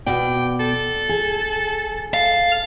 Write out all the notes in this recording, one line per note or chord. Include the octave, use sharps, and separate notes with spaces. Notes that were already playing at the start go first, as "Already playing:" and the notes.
B2 D5 G5
A4
G#4
A4 F5